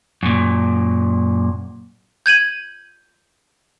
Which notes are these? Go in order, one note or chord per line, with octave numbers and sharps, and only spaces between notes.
F#2 A#2
G6 G#6 D#7 F#7